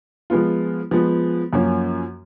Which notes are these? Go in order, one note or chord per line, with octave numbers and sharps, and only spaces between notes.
F3 G#3 B3 F4
F3 G#3 B3
F#2 F3 A#3 C#4